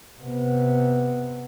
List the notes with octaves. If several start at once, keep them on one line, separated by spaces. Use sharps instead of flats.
C3 B3